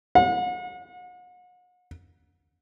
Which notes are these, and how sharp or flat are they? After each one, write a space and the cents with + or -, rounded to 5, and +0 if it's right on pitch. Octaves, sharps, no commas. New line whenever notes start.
F#5 -40